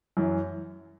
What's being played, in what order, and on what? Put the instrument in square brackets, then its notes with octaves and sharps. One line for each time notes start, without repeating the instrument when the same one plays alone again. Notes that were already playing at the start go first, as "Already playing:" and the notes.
[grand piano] F#2 E3